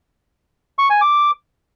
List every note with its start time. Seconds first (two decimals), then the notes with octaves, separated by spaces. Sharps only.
0.79 C#6
0.90 G#5
1.01 D6